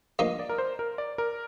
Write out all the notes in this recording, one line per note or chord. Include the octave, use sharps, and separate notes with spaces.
G2 F3 A#3 D#4 D#5
D5
A#4
C5
A#4
D5
A#4